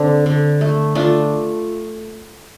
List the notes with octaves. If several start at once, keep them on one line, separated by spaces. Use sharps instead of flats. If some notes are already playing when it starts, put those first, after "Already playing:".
Already playing: D3 C4 D4
D3
A3
A3 D4 F4